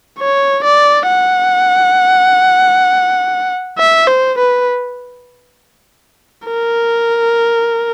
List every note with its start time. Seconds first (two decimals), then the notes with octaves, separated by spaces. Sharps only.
0.19 C#5
0.64 D5
1.08 F#5
3.79 E5
4.08 C5
4.38 B4
6.48 A#4